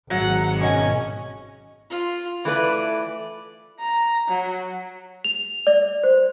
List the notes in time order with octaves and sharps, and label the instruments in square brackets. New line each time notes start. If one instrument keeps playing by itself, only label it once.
[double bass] G#1 [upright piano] F#3 [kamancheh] F#5
[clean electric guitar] B1 D#5 [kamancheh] C#4 G#5
[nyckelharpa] F4
[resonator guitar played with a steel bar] E3 A3 B4 [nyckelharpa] D5
[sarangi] A#5
F#3
[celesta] F7
D5
C5